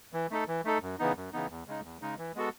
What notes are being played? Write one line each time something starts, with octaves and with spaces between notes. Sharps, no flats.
E3
A3 D#4 A4
E3
A3 D#4 A4
F#2
C#3 E3 B3 D#4
F#2
C#3 E3 B3 D#4
E2
C#3 G#3 D#4
E2
C#3 G#3 D#4
E3
G#3 B3 F#4 A4